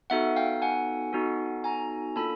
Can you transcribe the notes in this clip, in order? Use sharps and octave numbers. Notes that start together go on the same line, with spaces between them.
B3 D#4 F#4 A4 E5 F#5
F5 G5
F#5 G#5
B3 D#4 F#4 A4
G#5 A#5
A#3 D4 F4 A4 A5 B5